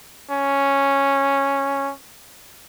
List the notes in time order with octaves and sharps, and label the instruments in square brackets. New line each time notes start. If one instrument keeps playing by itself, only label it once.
[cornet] C#4